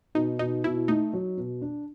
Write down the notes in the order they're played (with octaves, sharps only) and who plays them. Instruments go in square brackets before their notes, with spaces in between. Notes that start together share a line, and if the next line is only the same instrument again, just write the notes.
[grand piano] B2 [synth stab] D#4
[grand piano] B2 [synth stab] D#4
[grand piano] B2 [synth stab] E4
[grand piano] A3 [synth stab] D#4
[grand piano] F#3
B2
D4